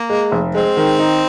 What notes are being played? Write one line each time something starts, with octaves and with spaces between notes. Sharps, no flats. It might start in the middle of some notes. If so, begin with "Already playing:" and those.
Already playing: A#3
G#3
F1
G#3 C4
D#3
D#4